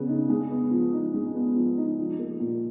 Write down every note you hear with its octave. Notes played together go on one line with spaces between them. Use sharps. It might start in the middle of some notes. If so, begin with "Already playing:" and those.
Already playing: C#3 B3
D#4
G#3
B3
F3
D#4
G#3
B3
F3
D#4
F3
A#3
A#2